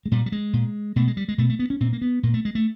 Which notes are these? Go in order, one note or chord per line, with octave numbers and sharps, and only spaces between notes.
G#3
A#2 G3
G3
G#3
A#2
B2 A3
G#3
G3
G#3
B2 A3
A3
B3
C#4
A#2 C4
A#3
B3
A#2 A#3
A3
G#3
A3